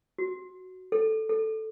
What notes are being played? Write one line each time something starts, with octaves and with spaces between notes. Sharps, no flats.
F#4
A4
A4